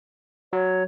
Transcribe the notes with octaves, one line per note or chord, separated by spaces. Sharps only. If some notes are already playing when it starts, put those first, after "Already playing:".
F#3 C#5